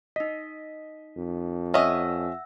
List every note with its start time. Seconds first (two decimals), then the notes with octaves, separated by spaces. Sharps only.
0.16 D#4 D#5 B6
1.17 F2
1.74 C#4 D#5 E5 F#5 E6 A#6